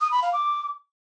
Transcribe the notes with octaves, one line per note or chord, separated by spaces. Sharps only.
D#6
B5
F5
D6